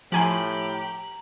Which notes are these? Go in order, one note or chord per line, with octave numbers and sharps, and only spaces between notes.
A2 F3 G4 G#5 A#5 C6 F#7